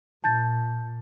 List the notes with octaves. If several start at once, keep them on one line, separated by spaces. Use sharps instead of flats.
A#2 A5 G6 A6